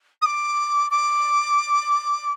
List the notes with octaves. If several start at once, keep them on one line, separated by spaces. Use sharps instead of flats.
D#6
D6
D6